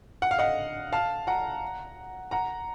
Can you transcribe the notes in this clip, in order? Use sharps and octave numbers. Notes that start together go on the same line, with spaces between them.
F#5
F5
D#5 F#5
F5 A5
F#5 A#5
F#5 A#5